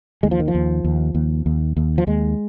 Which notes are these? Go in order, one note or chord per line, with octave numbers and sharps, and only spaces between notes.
D#2 G#3
F3
D#3
F3
D#2
D#2
D#2
D#2
D#2
F3
D#2 G#3